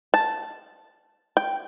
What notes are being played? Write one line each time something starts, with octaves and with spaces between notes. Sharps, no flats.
A5
G5